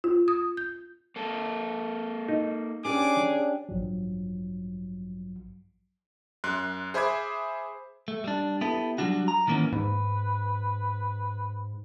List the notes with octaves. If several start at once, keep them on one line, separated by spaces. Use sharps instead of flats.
F4
D#6
G6
A#3 A4
D#4
C#4 D4 G4 G#4 D6
A1 G2 F3 F#3
F#2 C6 F#6
G#4 C5 E5 B5 D6 G#6
A3
G3 D4
B3 E4 G4 A4
F#3 G3 D4 F#4
A#5
D#3 E3 A#3 B3 C#4
G#2 B4